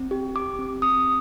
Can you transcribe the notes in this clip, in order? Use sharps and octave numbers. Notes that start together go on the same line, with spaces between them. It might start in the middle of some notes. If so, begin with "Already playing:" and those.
Already playing: C4
G4
G4 D6
C4
C4 D#6